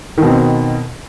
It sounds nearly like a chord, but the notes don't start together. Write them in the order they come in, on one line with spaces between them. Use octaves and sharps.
D#3 B2 C4